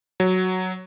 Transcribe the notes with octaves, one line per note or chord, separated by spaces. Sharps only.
F#3